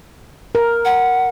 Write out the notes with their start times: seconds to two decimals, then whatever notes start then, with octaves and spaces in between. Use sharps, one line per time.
0.55 A#4
0.85 F#5